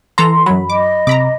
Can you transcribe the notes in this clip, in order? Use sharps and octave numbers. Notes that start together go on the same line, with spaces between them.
E3 A4 A#5 C6
F#2 F#3 B5
D#5 D6
C3 A#5 B5 D6